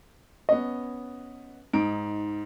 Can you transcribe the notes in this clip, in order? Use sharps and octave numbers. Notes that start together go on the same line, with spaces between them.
B3 C#4 D#5
G#2 D#4 D7